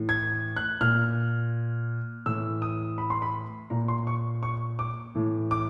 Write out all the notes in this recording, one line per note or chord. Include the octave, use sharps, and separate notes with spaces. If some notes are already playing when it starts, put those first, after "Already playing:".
Already playing: A2 E3
G#6
F#6
A#2 F6
A2 E3 E6
D#6
B5
C6
B5
A#2 A#5
C6
C#6
C#6
D6
A2 E3
D6